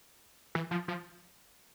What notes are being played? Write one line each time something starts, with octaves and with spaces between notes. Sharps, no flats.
E3
F3
F3